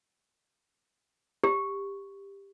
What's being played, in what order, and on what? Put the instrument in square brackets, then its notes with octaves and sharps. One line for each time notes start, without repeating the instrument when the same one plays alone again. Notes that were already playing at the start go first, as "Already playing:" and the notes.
[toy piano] G4